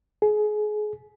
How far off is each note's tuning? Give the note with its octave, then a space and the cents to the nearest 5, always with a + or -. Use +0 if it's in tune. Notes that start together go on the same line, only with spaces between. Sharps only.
G#4 +30